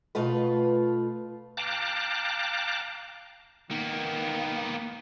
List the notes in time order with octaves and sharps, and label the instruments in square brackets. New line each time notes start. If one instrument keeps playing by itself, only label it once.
[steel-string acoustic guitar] B2 A3 F4 B4
[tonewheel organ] F5 G5 A5 A#5 D6 F#6
[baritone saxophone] D#3 [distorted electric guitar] A#3 B3